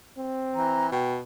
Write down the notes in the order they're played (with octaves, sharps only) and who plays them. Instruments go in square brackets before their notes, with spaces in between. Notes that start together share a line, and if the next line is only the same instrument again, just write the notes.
[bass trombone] C4
[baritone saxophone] E3 [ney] A#5
[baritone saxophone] B2 [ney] G5